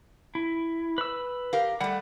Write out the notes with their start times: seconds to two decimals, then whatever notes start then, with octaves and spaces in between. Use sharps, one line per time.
0.35 E4
0.98 B4 E6
1.53 G4 A#4 F5
1.81 G3 A3 F#5